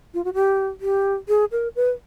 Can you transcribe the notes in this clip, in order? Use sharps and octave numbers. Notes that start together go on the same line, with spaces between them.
F4
F#4
G4
G4
G#4
A#4
B4